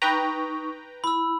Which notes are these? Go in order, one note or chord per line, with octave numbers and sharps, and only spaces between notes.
D#4 B4 G5 A#5 C#6
E4 B5 E6